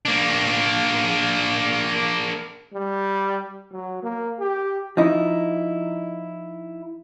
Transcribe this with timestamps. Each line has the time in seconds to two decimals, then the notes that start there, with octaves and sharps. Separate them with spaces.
0.05 A#3 D4
2.74 G3
3.72 F#3
4.03 A#3
4.39 G4
4.97 F3 D#4 E4